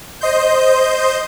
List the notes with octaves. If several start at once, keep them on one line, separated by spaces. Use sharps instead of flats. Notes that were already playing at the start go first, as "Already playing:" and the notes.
C5 D#5 C6 G6